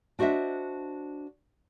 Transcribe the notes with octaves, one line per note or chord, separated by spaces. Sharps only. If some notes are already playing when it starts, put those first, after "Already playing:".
D4 F#4 C5 D#5 E5